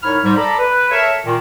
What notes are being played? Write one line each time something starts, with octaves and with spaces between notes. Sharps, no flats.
C2 G#2 C#5 B5 F6
G#2 G3
A4 D5 A#5 B5
B4
A4 A#4 C#5 E5
A#2 D#3